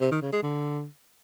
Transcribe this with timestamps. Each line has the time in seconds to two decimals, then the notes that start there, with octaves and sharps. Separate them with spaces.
0.01 C3
0.11 D#3
0.22 C#3
0.32 G#3
0.43 D3